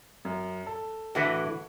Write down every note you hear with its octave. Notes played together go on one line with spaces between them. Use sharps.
F#2
A4
A2 D3 E3 F#4 B4 E5